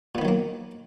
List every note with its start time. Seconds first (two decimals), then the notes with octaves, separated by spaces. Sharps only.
0.15 A#2
0.18 B3
0.22 D#3
0.25 F#3
0.28 A#3